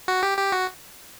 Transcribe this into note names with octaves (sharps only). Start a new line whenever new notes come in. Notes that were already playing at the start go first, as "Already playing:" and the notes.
F#4
G4
G4
F#4